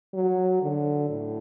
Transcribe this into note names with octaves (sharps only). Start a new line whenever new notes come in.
F#3
D3
A2